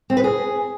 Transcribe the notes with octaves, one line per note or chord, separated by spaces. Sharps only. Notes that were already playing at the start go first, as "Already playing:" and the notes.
C4
B4
G#4